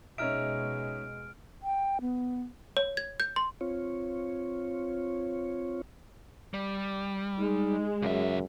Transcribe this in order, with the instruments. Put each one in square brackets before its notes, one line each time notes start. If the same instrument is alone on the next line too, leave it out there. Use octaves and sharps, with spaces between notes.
[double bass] B2 G#3 [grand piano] C#4 D#4 E5 [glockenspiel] F6 D7
[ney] G5
B3
[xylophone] C#5
G#6
G6
C6
[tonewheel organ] C4 F4 C#5
[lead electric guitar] G3
[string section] G#3 [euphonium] D#4
[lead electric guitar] C#2 E5 [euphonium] F#2